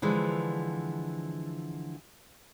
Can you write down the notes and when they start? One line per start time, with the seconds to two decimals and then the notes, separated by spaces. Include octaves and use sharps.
0.02 D3 E3 F3 G#3